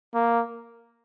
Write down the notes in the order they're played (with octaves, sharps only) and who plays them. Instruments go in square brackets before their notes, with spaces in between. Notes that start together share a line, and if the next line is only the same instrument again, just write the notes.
[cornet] A#3